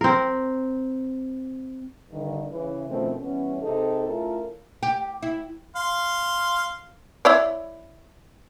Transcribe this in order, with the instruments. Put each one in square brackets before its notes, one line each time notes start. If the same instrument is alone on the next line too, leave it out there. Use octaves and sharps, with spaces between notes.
[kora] C4 A#4
[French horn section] G2 D3 D#3
C#3 E3
B2 D#3 F3 A3 C4 C#4
E3 G3 B3 C#4
C3 D#4 G#4 A4
A3 C#4 E4 F4 A4 A#4
[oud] G4
E4
[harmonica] F5 C6
[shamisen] E4 C#5 D5